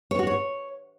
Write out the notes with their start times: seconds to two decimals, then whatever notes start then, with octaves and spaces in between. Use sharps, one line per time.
0.11 C#5
0.19 F#4
0.27 C#5